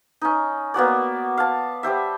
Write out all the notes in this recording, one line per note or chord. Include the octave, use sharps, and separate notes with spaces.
C#4 D#4
A#3 B3 F#4 D5
F5 A5
G3 G4 C5 E5